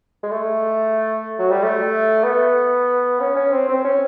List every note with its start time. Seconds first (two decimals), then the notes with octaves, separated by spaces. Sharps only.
0.24 G#3
0.31 A3
1.39 F#3
1.51 G3
1.64 A3
2.24 B3
3.20 C#4
3.36 C#4
3.52 C4
3.68 C4
3.85 C#4